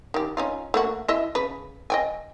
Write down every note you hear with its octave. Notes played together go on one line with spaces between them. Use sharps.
D#3 G4
C#4 D#4 F4
A3 A#3 F#4
E4 D#5 E5
C#3 B4
D#5 G5 G#5